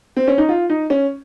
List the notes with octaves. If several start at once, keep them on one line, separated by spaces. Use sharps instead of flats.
C4
C#4
D#4
F4
D#4
C#4